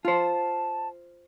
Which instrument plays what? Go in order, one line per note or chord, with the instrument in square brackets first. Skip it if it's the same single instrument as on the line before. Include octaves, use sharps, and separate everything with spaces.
[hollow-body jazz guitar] F4 C5 [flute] A5